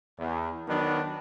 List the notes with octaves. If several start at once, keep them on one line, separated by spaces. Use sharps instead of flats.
E2
D#3 F#3 B3 D4